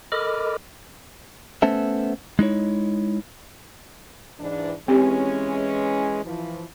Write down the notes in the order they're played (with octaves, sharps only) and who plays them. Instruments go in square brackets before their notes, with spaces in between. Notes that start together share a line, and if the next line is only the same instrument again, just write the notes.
[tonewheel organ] A4 A#4 D#5 B5 D6 F6
[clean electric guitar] A3 B3 C#4 A4 C5 E5
G#3 D#4 E4 C#5
[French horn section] G#2 E3 D4
[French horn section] E3 G#3 C#4 [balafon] C4 G4
[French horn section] E3 F3